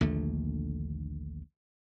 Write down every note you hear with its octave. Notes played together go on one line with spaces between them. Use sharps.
A#1 D#2 D3 A3